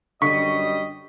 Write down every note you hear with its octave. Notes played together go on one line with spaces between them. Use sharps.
F#2 D3 G3 D#5 C#6 B6